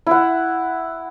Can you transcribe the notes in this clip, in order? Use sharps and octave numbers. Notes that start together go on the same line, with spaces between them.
E4 F#5